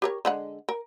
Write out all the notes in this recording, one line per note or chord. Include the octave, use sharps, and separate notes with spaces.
G4 A#4 C#5
D3 G#3 F#5
A#4